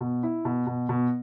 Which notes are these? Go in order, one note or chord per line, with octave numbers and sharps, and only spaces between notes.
B2
E4
B2
B2
B2